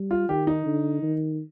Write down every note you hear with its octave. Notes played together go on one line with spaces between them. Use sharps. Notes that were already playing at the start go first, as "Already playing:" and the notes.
Already playing: G3
F4
D#3 G4
D#4
D3
D#3